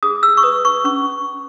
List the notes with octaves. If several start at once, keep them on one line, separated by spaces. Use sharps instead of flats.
G#4 D#6
E6
C#6
B4 D#6
C#6
C#4 C#6